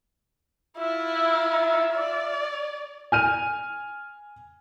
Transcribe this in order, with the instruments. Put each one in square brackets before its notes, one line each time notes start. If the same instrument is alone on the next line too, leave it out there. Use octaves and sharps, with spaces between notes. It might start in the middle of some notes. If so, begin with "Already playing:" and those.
[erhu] E4 [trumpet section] F4 E5
[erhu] D5
[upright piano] G#5 F6 D#7